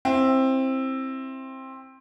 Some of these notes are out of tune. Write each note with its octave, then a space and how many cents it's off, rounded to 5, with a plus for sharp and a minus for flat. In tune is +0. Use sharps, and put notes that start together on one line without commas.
C4 +15 E4 +0